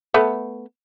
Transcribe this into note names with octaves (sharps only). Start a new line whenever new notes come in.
A3 B3